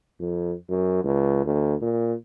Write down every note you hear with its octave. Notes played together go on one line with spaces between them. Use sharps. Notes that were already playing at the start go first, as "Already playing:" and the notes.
F2
F#2
C#2
D2
A#2